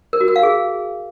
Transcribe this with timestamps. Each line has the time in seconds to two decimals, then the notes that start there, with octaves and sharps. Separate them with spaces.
0.13 A#4
0.21 F#4
0.28 A#4
0.36 F5
0.43 G#4